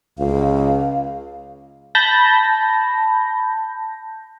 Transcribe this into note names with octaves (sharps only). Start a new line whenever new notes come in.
C#2 F5
A5 B5 G6 A#6